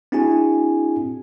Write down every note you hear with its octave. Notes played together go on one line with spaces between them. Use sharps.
C4 D4 E4 F#4 G#4 G#5